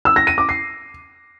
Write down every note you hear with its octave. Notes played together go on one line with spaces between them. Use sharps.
E6
A#6
D#7
D6
C7